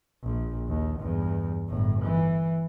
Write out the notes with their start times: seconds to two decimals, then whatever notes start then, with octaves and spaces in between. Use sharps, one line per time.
0.23 A#1
0.68 D#2
1.00 E2 G2
1.69 G1 A2
2.05 E3